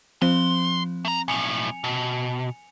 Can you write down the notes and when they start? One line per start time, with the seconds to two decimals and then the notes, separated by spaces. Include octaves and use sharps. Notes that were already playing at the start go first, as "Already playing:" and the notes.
0.22 F3 C4 C6
1.05 A3 A#5
1.28 B1 A2 G#5 C#7 F7
1.84 B2